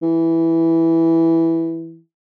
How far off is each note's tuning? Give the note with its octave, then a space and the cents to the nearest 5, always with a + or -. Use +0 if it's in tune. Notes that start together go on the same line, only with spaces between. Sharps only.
E3 -5